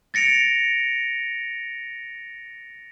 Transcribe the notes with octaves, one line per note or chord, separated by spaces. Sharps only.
A6 A#6 C#7 D7 F7